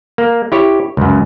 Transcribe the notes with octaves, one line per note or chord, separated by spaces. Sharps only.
A#3
E4 G4 C#5
C#2 F#2